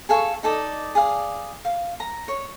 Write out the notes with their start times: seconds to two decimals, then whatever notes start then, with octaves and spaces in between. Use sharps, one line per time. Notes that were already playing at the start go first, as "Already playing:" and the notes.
0.09 G#4 A4 F5 C#6
0.43 D#4 A4 D5 D#5
0.95 G#4 D5 F5
1.65 F5
2.00 A#5
2.28 C#5